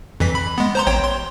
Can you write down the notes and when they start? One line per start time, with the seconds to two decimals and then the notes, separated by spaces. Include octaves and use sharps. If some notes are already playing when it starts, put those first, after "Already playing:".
0.20 F2 E3 B6
0.35 B5
0.58 G#3 B3
0.75 C5 A#5 C6
0.87 A1 C#5 G5
1.04 C6